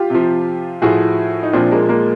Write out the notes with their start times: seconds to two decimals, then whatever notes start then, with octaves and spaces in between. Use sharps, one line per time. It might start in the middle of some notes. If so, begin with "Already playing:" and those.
Already playing: F4 G4
0.10 C3 F3
0.82 A2 F3 F#4 G#4
1.43 D#4
1.53 A#2 F3 C4 D4
1.71 G#3 A#3
1.89 G#3 A#3